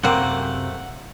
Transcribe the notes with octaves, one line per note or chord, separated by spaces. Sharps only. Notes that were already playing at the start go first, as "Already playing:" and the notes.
F#2 C3 A3 A#3 C4 F#5